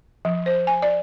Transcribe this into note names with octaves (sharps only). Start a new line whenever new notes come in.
F3
C5
G#5
D5